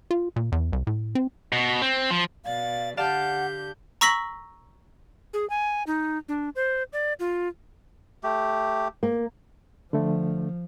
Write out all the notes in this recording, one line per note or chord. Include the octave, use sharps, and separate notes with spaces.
F4
A#2
E2
C2
A2
C4
B2
C4
F3
B2 D5 F5 A6
D3 G4 D5 F5 F#5 A5 G6
A#5 C#6 E6 A#6 B6 F#7
G#4
G#5
D#4
D4
C5
D5
F4
A3 G4
A#3
D3 F3 A3